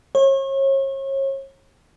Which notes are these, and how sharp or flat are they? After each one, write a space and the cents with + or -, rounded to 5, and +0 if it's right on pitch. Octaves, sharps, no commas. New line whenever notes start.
C#5 -35